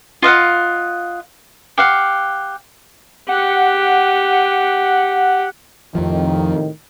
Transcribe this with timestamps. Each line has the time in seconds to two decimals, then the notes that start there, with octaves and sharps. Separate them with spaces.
0.22 F4 D#5 F5 F#5
1.78 G4 F5 F#5
3.29 G4 F#5
5.95 F2 A2 C3 D#3 F3